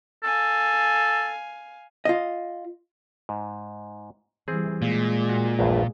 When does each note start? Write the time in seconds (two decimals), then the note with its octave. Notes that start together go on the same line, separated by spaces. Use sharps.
0.24 A4 F5 G#5
2.05 F4 D#5
3.29 G#2
4.48 E3 G3 C4 G#4
4.82 A#2 G#3
5.29 F#4
5.59 A#1 E2 G2